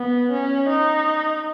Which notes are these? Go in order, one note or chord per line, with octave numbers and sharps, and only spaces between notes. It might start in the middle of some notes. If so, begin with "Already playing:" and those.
Already playing: B3
C#4
D#4